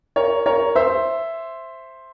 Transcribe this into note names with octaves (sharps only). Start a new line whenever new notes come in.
A#4 C#5
A#4 C#5
C5 E5